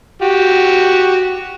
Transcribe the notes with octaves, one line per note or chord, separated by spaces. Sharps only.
F#4 G4